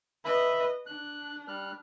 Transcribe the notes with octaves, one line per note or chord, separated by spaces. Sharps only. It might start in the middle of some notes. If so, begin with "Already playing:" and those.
B4 D#5 E5 B5
D4 F#6
G3 F6 F#6